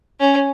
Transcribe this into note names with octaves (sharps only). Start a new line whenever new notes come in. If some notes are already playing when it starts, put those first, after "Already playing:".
C#4